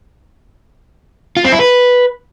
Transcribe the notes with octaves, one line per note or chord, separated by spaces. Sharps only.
F4
C4
E4
B4